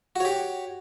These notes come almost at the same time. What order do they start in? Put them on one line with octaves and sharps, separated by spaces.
F#4 C#5 G4